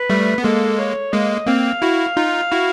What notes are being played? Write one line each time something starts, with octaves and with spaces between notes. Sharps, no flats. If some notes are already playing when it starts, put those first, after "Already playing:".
Already playing: B4
G3 A3
B3
G#3 A#3 A4
C#5
G#3 A#3 D#5
A#3 C4 F5
E4 F#4
D#4 F4
E4 F#4